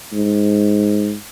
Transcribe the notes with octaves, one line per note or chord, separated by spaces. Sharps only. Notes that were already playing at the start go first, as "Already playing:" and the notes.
G#2